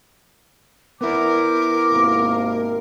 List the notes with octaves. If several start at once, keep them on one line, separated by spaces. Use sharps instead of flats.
B3 E4 A#4 D6
G#1 C3 A#3